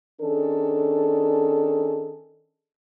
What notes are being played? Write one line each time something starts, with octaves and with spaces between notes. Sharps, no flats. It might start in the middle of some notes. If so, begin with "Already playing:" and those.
D#3 C#4 D4 G#4 A4